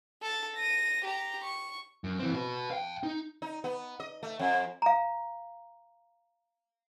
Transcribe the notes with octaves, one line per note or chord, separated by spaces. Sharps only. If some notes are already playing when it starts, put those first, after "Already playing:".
A4 A6
A#6 D#7
G4 A#5
C#6
F#2
E3 C4
F#4 B4
F5 G5
D#4
D#4
B3
D#5
A3
F2
F5 A#5